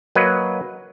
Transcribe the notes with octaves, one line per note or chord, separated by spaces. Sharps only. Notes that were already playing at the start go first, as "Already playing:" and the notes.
F#3 A#3 B4 D#5